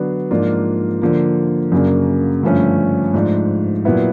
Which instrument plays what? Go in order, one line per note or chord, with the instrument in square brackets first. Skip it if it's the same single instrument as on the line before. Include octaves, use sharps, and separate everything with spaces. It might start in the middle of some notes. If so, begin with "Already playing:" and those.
Already playing: [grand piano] D3 F#3 B3 D4
G#2 F3 A#3 D4 F4
D3 F3 A#3
F#2 C#3 F#3 A#3 D4
G2 D3 F3 A3 C#4
G#2 F3 A3 D4
A#2 F#3 B3 E4